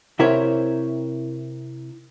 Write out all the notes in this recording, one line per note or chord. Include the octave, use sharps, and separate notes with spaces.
C3 E4 A#4 C5 C#5